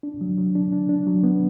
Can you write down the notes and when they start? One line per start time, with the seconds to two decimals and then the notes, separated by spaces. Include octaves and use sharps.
0.03 D4
0.21 F#3
0.38 F#3
0.55 D4
0.72 D4
0.89 D4
1.07 F#3
1.24 B3